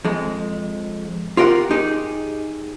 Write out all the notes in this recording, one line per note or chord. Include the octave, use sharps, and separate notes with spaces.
F2 G#3
F4 G4 A#4 D#5 F#5
D#4 G4 G#4